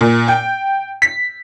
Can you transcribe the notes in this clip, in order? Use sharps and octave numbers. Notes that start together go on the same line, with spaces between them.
A#2
G5
B6